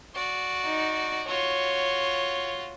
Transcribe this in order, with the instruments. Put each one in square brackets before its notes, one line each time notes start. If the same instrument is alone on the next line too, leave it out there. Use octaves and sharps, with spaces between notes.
[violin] F#4 D5
[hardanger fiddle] D#4
[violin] F4 F#4 [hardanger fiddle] C#5